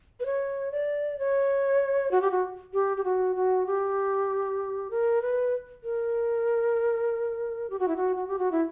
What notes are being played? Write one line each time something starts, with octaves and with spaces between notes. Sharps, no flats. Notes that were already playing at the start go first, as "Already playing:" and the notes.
B4
C#5
D5
C#5
F#4
G4
F#4
G4
G4
F#4
F#4
G4
A#4
B4
A#4
G4
F#4
E4
F#4
F#4
G4
F#4
E4